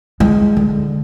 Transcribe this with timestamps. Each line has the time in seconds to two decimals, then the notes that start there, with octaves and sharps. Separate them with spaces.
0.20 G#3
0.57 D3